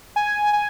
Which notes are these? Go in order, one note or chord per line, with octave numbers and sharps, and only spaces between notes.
G#5
G#5